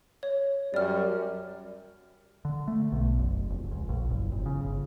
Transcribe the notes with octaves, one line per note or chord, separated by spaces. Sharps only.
C#5
F#2 G3 D5 F6
D3
A3
B1
F#1
F1
C#2
A#1
F#1
G1
C#3
G1